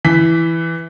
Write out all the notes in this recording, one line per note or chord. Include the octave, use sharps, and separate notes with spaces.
E3 B6